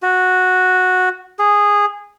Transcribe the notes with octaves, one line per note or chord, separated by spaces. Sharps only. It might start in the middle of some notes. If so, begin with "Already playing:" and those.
F#4
G#4